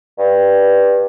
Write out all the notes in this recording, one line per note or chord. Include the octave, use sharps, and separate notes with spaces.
G2